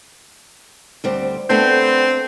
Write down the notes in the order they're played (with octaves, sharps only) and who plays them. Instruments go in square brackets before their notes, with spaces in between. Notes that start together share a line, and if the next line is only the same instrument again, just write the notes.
[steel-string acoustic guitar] D2 G3 C4
[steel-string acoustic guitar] A3 B3 D4 [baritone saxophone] C4